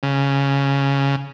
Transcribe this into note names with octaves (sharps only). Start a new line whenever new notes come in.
C#3